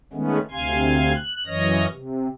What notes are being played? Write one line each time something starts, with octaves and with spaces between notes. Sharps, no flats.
D#3 G#3 A3 B3 C#4
D2 C3 F5 G#5 C6 G#6
F#6
F#2 E3 C#5 D#5 F6 A#6
C3